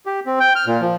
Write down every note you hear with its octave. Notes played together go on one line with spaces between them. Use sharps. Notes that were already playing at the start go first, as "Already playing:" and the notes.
G4
C4
G5
F6
A#2
F3